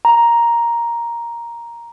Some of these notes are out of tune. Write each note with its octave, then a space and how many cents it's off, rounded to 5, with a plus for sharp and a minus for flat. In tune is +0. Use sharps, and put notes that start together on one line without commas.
A#5 +5